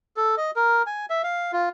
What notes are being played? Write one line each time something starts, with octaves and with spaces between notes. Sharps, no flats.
A4
D#5
A#4
G#5
E5
F5
F4